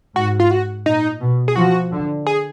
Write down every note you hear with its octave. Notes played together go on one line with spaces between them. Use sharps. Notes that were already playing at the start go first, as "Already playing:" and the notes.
G#2 F#4
F4
F#4
A#2 D#4
B2
G#4
F3 F#4
D3
G#4